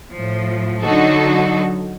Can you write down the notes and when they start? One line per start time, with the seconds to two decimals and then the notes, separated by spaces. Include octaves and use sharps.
0.11 A2 F3
0.82 D3 F#3 D#4 F#4 A4